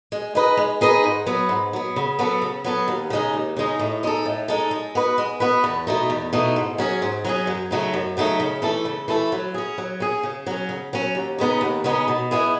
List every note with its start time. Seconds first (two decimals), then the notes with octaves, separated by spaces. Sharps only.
0.12 G#3
0.35 D#4 G#4 B4 D#5
0.57 G#3
0.81 D#4 G#4 B4 D#5
1.04 G#2
1.26 F#3 B3
1.49 G#2
1.73 F#3 B3
1.96 C#3
2.19 F#3 B3 F#4 A4
2.42 C#3
2.64 F#3 B3 F#4 A4
2.88 D#2
3.10 C#3 G#3 D#4
3.34 D#2
3.57 C#3 G#3 D#4
3.79 A2
4.03 G#3 D#4 A4
4.25 A2
4.48 G#3 D#4 A4
4.71 G#3
4.95 B3 F#4 B4
5.18 G#3
5.40 B3 F#4 B4
5.64 E2
5.87 B2 A3 D#4
6.10 E2
6.33 B2 A3 D#4
6.56 G#2
6.78 F#3 C#4 G#4
7.02 G#2
7.24 F#3 C#4 G#4
7.47 F#2
7.71 C#3 F#3 A3 D#4
7.94 F#2
8.17 C#3 F#3 A3 D#4
8.40 C#3
8.62 E3 A3 E4 A4
8.85 C#3
9.08 E3 A3 E4 A4
9.32 F#3
9.54 C#4 G#4
9.78 F#3
10.00 C#4 G#4
10.23 C#3
10.46 F#3 C#4
10.69 C#3
10.93 F#3 C#4
11.15 D#2
11.38 C#3 G#3 B3 D#4
11.61 D#2
11.84 C#3 G#3 B3 D#4
12.08 B2
12.31 G#3 B3 E4 G#4